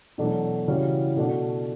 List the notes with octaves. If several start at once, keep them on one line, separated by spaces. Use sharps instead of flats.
E2 B2 F#3 A3 D4
C#3 E3 G3 C#4 F#4
B2 A3 D4 F#4